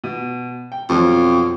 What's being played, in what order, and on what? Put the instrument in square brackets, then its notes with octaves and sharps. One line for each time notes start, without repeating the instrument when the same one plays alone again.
[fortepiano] B2
G5
[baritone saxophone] F2 [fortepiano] B2 F3 F#3